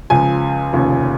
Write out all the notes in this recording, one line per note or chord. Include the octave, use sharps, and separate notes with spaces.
C#2 C#3 F3 G#5
F1 D#2 C#3 F3